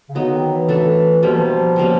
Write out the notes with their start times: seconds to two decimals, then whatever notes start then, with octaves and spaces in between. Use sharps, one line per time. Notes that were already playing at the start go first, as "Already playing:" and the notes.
0.09 C#3
0.14 D3 F#3 B3 D#4 F#4
0.33 D#3
0.51 E3
0.69 A3 D4 F#4 A4
1.23 B2 F3 G3 A#3
1.31 E3
1.39 F3
1.76 B2 G3 A#3 C#4